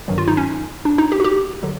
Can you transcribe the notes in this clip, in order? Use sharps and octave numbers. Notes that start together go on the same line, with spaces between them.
G1 G2 D#3 F#3
F4
D#4
C#4
D4
D#4
G4
F#4
G4
D3 F#3